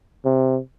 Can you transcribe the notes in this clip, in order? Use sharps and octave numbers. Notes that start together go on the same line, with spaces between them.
C3